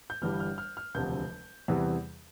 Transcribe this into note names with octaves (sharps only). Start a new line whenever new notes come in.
G6
G1 G2 E3 G3 F6
F6
F6
F6
E1 D2 C3 F3 G6
E2 C3 E3 G3